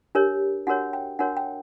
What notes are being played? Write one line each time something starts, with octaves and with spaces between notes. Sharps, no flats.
D4 G4 A#4 C#5
D4 F#4 A#4 C#5 F#5
G5
D4 F#4 A#4 C#5 F#5
G5